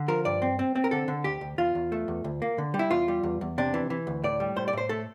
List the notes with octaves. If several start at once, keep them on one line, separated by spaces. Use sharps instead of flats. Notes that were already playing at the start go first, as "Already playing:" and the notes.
Already playing: D3
F3 A#4
G2 D5
C4
C4
C4
A#4
D3 A4
D3
D2 G4
D2
E2 F4
E2
A3
E2
D2
A#3
D3
G3
E4
E2 F4
G3
E2
E2
C3 D4
E3
E3
D2
A2 D5
G3
A2 C5
D5
A2 C5
A3 A4